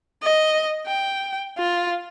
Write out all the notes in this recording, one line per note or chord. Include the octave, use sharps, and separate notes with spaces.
D#5
G5
F4